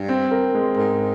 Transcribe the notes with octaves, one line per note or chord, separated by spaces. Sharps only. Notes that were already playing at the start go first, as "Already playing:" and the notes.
Already playing: G2
C4
A#4
G#3
G#2 A#4